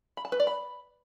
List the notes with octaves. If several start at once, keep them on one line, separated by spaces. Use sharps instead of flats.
B5
A5
B4
D5
B5